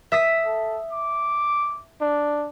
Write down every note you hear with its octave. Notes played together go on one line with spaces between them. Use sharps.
E5 D#6 B6
A4
D6
D4